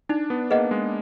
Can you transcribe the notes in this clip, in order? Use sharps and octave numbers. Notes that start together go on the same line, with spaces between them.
D4 D#4
B3
A#3 G#4 B4 D#5 F#5
G#3